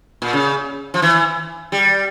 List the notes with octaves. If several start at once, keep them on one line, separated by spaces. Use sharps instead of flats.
A#2
C#3
F3
E3
G3